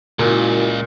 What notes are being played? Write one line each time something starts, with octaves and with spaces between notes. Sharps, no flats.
C#2 A#2 E4 F#4 A#4